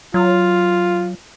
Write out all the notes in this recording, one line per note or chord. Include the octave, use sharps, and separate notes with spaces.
F#3 F4